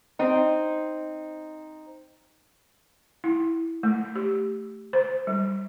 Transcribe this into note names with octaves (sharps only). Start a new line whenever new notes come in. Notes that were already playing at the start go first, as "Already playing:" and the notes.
C4 D#4
E4
A3
G4
C5
G3